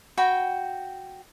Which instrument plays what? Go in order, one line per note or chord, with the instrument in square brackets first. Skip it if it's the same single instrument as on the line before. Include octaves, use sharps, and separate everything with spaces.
[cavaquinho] F#4 G5 B5